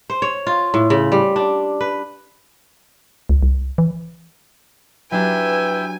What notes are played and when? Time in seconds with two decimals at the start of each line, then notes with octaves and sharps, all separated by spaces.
0.10 C5
0.22 C#5
0.47 F4
0.74 A2
0.90 C#3
1.12 G3
1.36 D4
1.81 B4
3.29 C#2
3.43 C2
3.78 E3
5.11 F#3 D4 E4 G4 B4 E5 G5 G#5